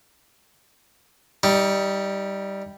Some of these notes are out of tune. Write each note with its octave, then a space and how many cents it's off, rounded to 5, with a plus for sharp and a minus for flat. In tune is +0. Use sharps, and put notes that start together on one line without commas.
G3 +0 D#4 +30